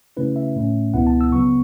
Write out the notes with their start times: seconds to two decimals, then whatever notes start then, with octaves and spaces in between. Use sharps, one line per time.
0.17 C#3 A3 C#4 E4 B4
0.36 E5
0.56 A2 A3 C#4
0.94 C#2 B2 B3 E4 F#5
1.07 A5
1.21 E6
1.32 C#3 F#3 B3 C#6